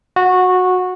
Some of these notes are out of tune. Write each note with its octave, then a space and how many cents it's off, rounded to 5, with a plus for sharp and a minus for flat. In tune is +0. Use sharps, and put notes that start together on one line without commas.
F#4 -15 F#5 +0